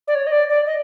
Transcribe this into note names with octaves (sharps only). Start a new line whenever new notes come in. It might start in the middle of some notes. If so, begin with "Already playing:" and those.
D5
C#5
D#5
D5
D5
D#5